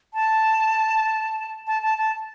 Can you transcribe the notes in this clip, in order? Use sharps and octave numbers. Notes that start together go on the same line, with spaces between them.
A5
A5
A5
A5